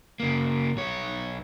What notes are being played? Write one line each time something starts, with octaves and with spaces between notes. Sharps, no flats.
C#3 A#3
B1 C#5